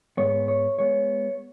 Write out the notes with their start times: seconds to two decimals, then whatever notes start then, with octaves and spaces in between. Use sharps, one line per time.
0.17 G#2 G#3 B3 C#5
0.48 C#5
0.79 G#3 B3 C#5